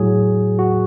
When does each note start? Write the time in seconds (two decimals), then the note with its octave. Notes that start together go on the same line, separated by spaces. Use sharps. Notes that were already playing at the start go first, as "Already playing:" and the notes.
Already playing: A2 F#3 G#4
0.59 F#4